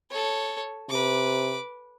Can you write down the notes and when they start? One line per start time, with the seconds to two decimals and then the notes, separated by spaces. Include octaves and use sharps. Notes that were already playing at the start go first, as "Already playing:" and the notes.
0.10 A4 C#5
0.89 C3 B4 D6